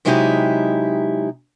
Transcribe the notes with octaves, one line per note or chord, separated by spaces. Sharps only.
C3 F#3 G#3 D#4 E4 G4